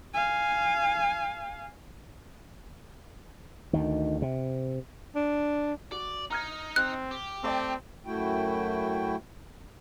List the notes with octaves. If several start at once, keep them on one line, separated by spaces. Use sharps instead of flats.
F5 G#5
D2 D#3
C3
D4
F#4 D5
D#4 A#5 F6 G#6
C4 F#6
G4
A3 C4 D5 G5
F#2 A3 E4 F#4 G5